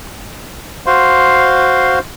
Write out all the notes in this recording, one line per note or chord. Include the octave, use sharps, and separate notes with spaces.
F#4 C5 F5 C6